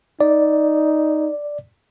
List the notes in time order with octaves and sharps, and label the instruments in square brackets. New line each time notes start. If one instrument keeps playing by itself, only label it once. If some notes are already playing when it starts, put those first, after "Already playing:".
[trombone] D#4 [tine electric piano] D5